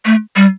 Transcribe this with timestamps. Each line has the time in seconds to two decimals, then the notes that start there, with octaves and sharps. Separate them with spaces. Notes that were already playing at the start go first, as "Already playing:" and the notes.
0.06 A3
0.36 G3